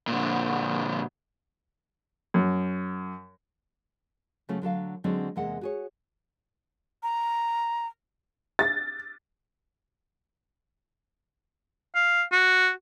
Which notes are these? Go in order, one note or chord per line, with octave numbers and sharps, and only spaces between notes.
A#2 D3
F#2
C#3 F#3 A3 C#4 F4
D3 F#3 A4 F5
D3 F#3 G#3 C4 C#4
E2 C3 G#3 A#3 F#5
F#4 G#4 C#5
A#5
A6
F5
F#4